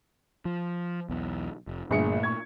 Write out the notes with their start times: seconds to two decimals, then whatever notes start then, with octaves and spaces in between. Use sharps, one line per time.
0.45 F3
1.10 B1 E2
1.67 F1
1.91 G1 A#2 A3 A#3 G#4 C#7
2.23 C#6 G#6